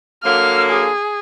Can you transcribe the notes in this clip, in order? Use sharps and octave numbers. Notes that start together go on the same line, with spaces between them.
D3 F#3 A#3 F6
G#4